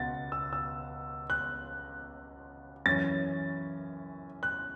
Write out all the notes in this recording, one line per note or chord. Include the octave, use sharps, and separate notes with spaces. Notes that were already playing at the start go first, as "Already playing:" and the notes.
Already playing: C#2 B2 B3 F#5 A6
E6
E6
F#6
F#2 E3 C#4 A6
F#6